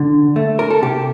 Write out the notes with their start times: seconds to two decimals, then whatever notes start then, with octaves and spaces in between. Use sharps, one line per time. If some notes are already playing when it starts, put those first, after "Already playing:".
Already playing: D3
0.36 A3
0.59 A#4
0.70 A4
0.82 C3 G4